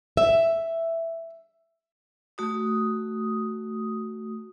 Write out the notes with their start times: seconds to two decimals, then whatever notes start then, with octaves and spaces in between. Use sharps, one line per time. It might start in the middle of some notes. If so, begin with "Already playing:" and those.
0.17 E5
2.38 A3 F#4 D#6